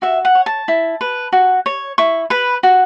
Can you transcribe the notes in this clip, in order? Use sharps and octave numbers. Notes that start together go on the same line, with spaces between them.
F#4 E5
F#5
C#5
A5
E4
B4
F#4
C#5
E4 C#6
B4 B5
F#4